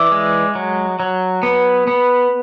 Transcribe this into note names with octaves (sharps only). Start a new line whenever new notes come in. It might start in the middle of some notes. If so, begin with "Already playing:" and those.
Already playing: E3 D5 E5
G#3
F#3
F#3
B3
B3